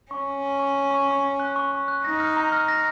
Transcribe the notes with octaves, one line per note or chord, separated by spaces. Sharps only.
C#4 C#6
C#6
C#6
C#6
C#6
C#6
C#6
C#6
F#6
C#6
C#6
F#6
D#4 A#6
F6
A#5
F6
A#6